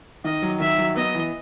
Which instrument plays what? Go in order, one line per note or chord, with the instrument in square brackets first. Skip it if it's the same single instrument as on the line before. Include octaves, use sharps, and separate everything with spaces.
[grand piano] D#3 [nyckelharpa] D#5
[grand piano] F#3
[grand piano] D#3 [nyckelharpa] E5
[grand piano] F#3
[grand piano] B3 [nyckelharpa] D#5
[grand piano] E3